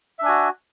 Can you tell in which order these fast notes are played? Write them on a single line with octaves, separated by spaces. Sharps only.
E5 D4 G#5 F#4